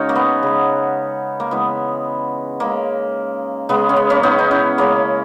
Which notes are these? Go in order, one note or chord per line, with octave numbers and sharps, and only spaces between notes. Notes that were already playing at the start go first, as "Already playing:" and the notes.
Already playing: C#3 G#3 C#4 D#4 F#4
A#3
B3
C#3 G#3
A#3
C#3 E3 G#3 B3
C#3 G#3 A#3
C#3 G#3 B3
C#4
B3
A#3 C#4
B3 D#4
D#4
C#4 E4
C#3 G#3 A#3 C#4